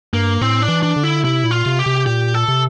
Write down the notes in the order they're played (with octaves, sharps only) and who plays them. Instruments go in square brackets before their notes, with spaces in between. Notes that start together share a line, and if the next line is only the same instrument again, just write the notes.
[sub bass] G2 [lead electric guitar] A#3
[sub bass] A2 [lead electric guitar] C4
[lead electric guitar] D4
[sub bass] E3
[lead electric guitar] D4
[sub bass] D3
[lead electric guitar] E4
[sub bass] C3 [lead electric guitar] E4
[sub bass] A#2
[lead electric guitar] F4
[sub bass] C3
[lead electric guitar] G4
[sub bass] C3
[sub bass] A#2 [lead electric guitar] G4
[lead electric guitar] A4
[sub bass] C3